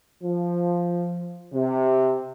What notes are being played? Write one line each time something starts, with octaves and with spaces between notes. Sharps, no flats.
F3
C3